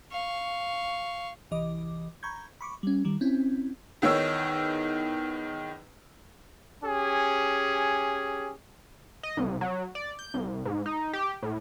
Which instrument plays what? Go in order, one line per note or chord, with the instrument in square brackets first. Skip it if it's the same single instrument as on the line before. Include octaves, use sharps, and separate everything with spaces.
[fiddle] F5 C#6
[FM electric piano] C2 E3 D#5 D6
A#5 B5 C#6 G6 G#6
B5 C#6 D6
G3 C#4
D#3 G3
C4 C#4 E4
[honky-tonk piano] E2 D#3 C#5 E6
[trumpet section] C#4 G4 G#4
[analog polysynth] D#5
C2
F#3
D5
G6
C2
G#2
D#4
G4
A2